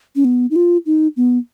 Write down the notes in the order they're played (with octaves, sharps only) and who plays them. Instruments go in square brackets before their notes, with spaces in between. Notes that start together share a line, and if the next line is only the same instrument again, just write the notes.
[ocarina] C#4
B3
D#4
F4
D#4
B3